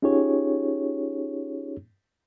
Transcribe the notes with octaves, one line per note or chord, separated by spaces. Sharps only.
C#4 D#4 F4 G4 G#4 C#5